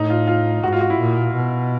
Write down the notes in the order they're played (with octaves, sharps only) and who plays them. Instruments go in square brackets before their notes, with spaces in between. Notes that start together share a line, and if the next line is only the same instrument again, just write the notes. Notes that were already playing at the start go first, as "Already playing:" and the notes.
Already playing: [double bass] A2 [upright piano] D#4
[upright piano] F4
F4
[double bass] G#2 [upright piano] F#4
[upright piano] F4
F#4
E4
[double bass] A#2
B2